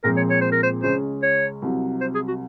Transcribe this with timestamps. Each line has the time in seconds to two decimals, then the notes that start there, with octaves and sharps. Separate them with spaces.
0.04 A#2 F3 G#3 C4 A#4
0.17 C#5
0.30 C#5
0.41 C5
0.52 A#4
0.63 C5
0.83 C#2 C#3 G#3 C#4 C5
1.22 C#5
1.62 C2 C3 F#3
2.01 C5
2.15 G#4
2.28 F#4